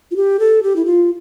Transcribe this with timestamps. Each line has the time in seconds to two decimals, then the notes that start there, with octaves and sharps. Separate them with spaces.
0.11 F4
0.16 G4
0.40 A4
0.63 G4
0.76 E4
0.86 F4